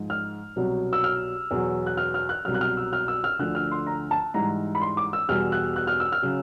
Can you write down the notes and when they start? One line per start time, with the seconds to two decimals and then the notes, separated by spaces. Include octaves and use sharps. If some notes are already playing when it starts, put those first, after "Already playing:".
Already playing: G#2 F3
0.10 F6
0.56 C2 B2 F#3
0.93 E6
1.04 F6
1.51 E2 B2 F#3
1.86 F#6
1.97 F6
2.14 F6
2.29 F#6
2.45 C2 B2 F#3 F6
2.54 F#6
2.61 F6
2.77 E6
2.93 F6
3.08 E6
3.24 F6
3.39 D2 D3 F3 F#6
3.55 F6
3.72 C6
3.86 A#5
4.11 A5
4.34 G#2 E3 G3 A#5
4.75 B5
4.82 C6
4.97 D6
5.13 E6
5.29 E2 B2 G3 F6
5.52 F#6
5.76 F#6
5.87 F6
6.00 E6
6.12 F6
6.22 C#3 F#3